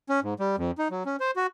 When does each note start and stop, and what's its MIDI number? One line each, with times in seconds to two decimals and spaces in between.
0.09 0.20 61
0.23 0.34 44
0.40 0.56 55
0.58 0.71 41
0.78 0.88 63
0.91 1.03 54
1.06 1.16 61
1.20 1.31 72
1.36 1.47 66